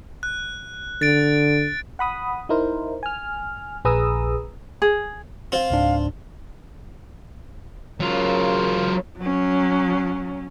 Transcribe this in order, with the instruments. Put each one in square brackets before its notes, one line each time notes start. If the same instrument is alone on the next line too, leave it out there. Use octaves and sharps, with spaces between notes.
[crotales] F#6
[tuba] D3 [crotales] A6 D7
[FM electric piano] F#5 B5 D#6
D#4 E4 A#4 C5
G#5 F6
A#1 G#4 B4 A#5 D#6 E6
[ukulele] G#4
[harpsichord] C4 F4 [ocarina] F5
[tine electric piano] C#2 G#2 D4
[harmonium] C#3 A#4 [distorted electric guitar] F#3 F4
[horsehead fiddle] F#3 C#4